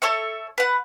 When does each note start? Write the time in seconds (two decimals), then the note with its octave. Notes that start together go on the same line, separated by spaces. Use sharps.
0.02 A4 C#5 E5 C#6
0.58 B4 F#5